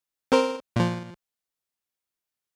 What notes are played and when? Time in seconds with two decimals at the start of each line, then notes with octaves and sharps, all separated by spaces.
0.32 C4 A#4 C5
0.76 A#2 F3